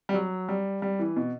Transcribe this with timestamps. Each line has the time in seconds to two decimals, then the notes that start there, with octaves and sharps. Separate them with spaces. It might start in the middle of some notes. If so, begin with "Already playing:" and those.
0.09 G3
0.14 F#3
0.49 G3
0.82 G3
0.99 E3
1.16 B2